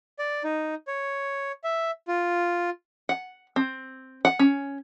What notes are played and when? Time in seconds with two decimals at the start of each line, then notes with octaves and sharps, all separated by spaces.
0.19 D5
0.44 D#4
0.87 C#5
1.64 E5
2.08 F4
3.09 F#5
3.56 C4
4.25 F#5
4.39 C#4